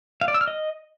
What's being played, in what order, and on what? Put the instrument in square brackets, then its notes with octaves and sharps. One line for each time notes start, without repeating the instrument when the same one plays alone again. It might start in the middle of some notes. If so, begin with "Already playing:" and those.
[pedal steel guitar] F5
D5
E6
F6
D#5